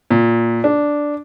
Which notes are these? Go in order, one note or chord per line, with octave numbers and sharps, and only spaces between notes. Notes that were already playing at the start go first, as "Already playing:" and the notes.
A#2
D4